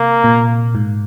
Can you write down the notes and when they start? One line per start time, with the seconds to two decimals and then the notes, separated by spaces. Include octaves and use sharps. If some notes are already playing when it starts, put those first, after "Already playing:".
Already playing: C3 A#3
0.24 A#2
0.75 G#2